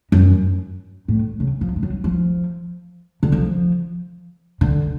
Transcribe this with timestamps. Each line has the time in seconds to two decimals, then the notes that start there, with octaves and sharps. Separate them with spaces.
0.12 F#2
1.08 A2
1.40 C#3
1.61 F3
1.76 G#3
1.83 F#3
2.04 F3
3.23 D3
3.32 F3
4.61 D3